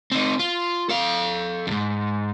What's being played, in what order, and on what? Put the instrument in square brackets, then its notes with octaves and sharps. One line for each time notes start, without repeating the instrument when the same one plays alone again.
[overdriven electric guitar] C4 D#4
F4
A4 F5
F2 G#2